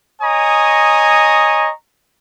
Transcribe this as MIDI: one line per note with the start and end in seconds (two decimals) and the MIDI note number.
0.22 1.71 73
0.22 1.71 75
0.22 1.71 80
0.22 1.71 82
0.22 1.71 85
0.22 1.71 87